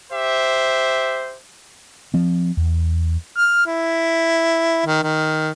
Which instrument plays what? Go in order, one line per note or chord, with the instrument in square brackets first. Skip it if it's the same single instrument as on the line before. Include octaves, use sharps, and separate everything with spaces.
[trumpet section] G4 C5 E5
[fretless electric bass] F3 C4
E2
[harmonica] F6
E4
D#3
D#3